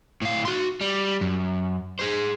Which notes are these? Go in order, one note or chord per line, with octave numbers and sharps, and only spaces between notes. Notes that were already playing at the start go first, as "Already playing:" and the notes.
A2 F5
F#4 C6
G3
F#2
G#4 C5